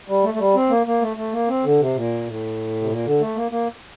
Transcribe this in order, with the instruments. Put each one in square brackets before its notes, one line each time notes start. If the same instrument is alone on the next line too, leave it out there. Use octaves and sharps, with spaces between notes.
[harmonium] G3
A3
A3
G3
C4
A#3
A#3
A3
A3
A#3
C4
D3
C3
A#2
A2
C3
A#2
D3
A3
A#3
A#3